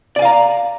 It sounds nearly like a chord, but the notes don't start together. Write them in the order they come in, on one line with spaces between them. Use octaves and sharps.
D5 G#5 F5 A#5